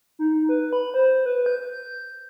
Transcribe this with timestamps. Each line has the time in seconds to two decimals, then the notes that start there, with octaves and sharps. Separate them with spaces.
0.19 D#4
0.49 B4
0.73 B5
0.94 C5
1.26 B4
1.46 G6